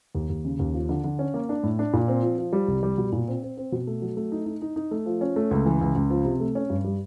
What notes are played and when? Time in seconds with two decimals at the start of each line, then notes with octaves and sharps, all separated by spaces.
0.15 D#2
0.29 D#2
0.45 C#3
0.59 D#2
0.74 F3
0.89 D3
1.04 D3
1.19 C#4
1.34 A#3
1.49 D4
1.63 A2
1.79 D4
1.93 A#2
2.08 C4
2.23 F3
2.39 F3
2.53 G3
2.68 C2
2.83 G3
2.98 B2
3.12 A#2
3.28 C4
3.43 C4
3.57 C4
3.72 B2
3.87 A3
4.02 F#3
4.17 A3
4.32 D#4
4.46 D#4
4.62 D#4
4.76 D#4
4.91 A3
5.06 F3
5.21 C#4
5.36 A3
5.51 C#2
5.66 E3
5.81 C#2
5.96 C#2
6.10 F3
6.25 C3
6.40 A3
6.55 C#4
6.70 G2
6.85 G3